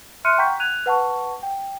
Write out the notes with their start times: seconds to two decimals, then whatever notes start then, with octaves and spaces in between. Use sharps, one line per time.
0.25 E5 C6 F6 F#6 C#7 D#7
0.37 F#5 G5 A#5 C#6 G6 B6
0.60 F#6 G#6 D#7 F7
0.86 B4 F#5 A5 C#6
1.43 G5